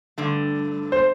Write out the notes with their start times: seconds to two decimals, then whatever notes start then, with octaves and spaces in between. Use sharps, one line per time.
0.18 G2 D3 A3
0.92 C5